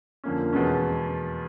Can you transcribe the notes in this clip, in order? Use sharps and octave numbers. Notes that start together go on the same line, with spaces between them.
F2 D3 F3 A#3 C#4
E2 B2 G#3 C#4